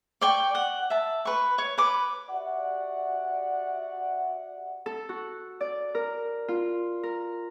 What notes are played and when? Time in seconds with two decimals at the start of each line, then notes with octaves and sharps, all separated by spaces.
0.21 D5 G5 C#6
0.55 F#5
0.90 E5 A5
1.25 B4 C#6
1.58 C#5
1.78 B4 D6
2.30 F#4 G4 D5 E5 F#5
4.86 A4
5.09 F#4
5.61 D5
5.95 A#4
6.48 F4
7.03 A#4